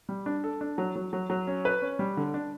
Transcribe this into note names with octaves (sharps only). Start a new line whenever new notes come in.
G3
D4
A4
D4
F#3
F#3
F#3
F#3
C#4
B4
C#4
G3
D3
D4